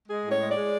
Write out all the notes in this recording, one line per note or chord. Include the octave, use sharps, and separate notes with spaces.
G#3 G#4
A2
C#5
G#3
D5
G#3